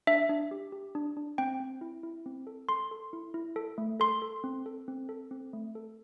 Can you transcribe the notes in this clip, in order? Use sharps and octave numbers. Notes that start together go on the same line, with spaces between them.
D4 E5
D4
G4
G4
D4
D4
C4 G5
C4
E4
E4
C4
A4
A4 C6
A4
E4
E4
A4
A3
A4 C6
A4
C4
A4
C4
A4
C4
A3
A4